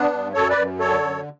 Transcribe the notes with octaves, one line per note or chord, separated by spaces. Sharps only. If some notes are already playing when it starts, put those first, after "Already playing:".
Already playing: B3 D4
G2
F#2 A4 C#5
B4 D5
F#2
D3 A4 C#5
F#2